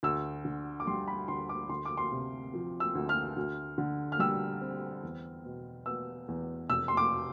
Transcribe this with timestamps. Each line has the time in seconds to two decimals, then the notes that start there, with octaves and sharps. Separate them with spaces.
0.03 D2 E6
0.45 D3
0.80 D6
0.87 G3 C6
1.07 B5
1.28 D2 C6
1.49 D6
1.69 D2 C6
1.85 D6
1.97 C6
2.11 C3
2.54 F3
2.80 E6
2.95 D2
3.09 F6
3.36 D2
3.78 D3
4.12 F6
4.19 G3 E6
4.61 C4
5.03 E2
5.45 B2
5.86 B3 E6
6.28 E2
6.69 F1 E6
6.88 C6
6.97 D6